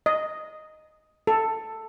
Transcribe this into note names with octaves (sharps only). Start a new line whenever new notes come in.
D#5
A4